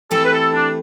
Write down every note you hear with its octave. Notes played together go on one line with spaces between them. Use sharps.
E3 A3 C4 E4 G4 A4
B4
A4
D4